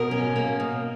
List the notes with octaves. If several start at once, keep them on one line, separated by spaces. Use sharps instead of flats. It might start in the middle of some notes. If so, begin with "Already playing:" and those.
Already playing: B2 A#4
C#4
A#3
B2